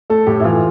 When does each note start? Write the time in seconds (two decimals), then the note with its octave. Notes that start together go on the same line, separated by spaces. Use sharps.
0.10 A3 A4
0.27 A2 G4
0.40 E4
0.44 E3 F4